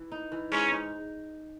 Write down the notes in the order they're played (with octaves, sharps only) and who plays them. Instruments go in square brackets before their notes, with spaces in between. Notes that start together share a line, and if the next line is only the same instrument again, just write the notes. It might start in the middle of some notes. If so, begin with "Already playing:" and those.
Already playing: [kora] E3
D#4
E3
[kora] G#2 [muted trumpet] C#4
[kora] D#4